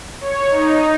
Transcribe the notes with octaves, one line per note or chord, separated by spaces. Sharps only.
C#5
D#4